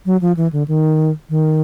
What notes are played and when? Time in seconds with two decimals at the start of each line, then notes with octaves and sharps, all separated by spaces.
0.06 F#3
0.21 F3
0.37 E3
0.53 D3
0.68 D#3
1.30 D#3